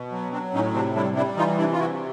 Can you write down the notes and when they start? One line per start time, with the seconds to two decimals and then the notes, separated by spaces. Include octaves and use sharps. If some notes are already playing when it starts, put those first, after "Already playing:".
Already playing: B2
0.12 F#3
0.32 F#3 C4 D4
0.54 A2 C#4 D#4
0.74 C3 C4 D4
0.95 G3 D4 E4
1.16 G3 D4 E4
1.37 E3 D#4 F4
1.58 C3 D4 E4
1.73 F4
1.79 C3 E4 F#4